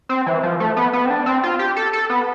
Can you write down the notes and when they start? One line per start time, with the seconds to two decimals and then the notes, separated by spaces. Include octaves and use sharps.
0.09 C4
0.26 E3
0.43 F3
0.60 A3
0.77 B3
0.93 B3
1.06 C4
1.10 D4
1.26 C4
1.43 F4
1.59 G4
1.76 A4
1.93 A4
2.10 B3